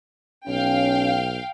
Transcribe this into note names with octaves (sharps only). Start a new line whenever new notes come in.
B1 C#4 F5 G5